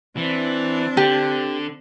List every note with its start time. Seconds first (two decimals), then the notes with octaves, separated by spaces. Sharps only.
0.17 E3 C4 D4
0.97 D3 G4